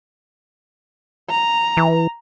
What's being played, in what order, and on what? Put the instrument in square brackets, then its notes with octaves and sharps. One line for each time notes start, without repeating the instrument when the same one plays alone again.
[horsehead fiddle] A#5
[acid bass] E3